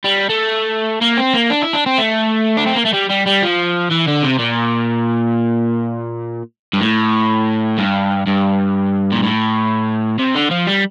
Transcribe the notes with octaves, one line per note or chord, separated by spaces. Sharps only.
G3
A3
A#3
C4
A#3
D4
E4
D4
C4
A3
D4
C4
A#3
A3
G3
G3
G3
F3
E3
D3
C3
A#2
G2
A2
G2
G2
A#2
A2
C3
D3
F3
G3